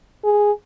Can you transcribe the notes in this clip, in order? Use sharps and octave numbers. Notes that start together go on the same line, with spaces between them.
G#4